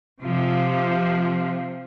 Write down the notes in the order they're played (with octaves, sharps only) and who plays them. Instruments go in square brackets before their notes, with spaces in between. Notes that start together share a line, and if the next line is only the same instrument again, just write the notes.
[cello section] C3 F3